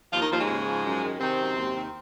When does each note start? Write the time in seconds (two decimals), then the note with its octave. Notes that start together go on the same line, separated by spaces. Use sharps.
0.11 D#2 F3 F4
0.21 D#3 D#4
0.30 D#2 F3
0.38 G#2 G#3
0.47 C#3
0.65 F3
0.84 F#2
1.02 D#3
1.19 C3 D#3 C4
1.38 F#2
1.56 D#2
1.74 D#3